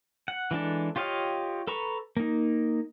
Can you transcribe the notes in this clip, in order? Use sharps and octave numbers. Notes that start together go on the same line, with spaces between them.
F#5
E3 G#3 D4 A4
F4 G4 C#5 D#5 F5
A4 B4 A#5 C#6
A#3 D#4